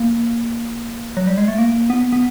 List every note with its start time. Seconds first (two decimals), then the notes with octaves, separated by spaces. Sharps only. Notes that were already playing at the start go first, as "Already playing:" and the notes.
Already playing: A#3
1.17 F#3
1.27 G3
1.38 G#3
1.48 A3
1.58 A#3
1.90 B3
2.13 B3